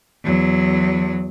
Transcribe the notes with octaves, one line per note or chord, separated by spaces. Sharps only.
E2 F#3